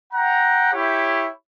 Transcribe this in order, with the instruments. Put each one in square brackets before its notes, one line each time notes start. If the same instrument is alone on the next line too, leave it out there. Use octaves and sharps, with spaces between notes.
[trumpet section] F#5 G5 A#5
E4 G4 C#5